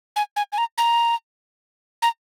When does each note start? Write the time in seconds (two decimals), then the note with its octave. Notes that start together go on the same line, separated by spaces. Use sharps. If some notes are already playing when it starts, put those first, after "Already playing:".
0.16 G#5
0.36 G#5
0.52 G#5
0.58 A#5
0.78 A#5
2.02 A#5